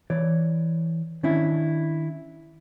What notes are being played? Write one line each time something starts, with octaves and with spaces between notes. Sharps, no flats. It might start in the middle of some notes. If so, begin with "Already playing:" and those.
E3 C#5 D5
D#3 C#4 D4 E4